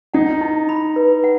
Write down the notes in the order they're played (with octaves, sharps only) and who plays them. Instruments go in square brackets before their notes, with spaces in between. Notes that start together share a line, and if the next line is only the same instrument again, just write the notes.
[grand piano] D#4 [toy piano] F#5
[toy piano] E4
B5
B4
F#5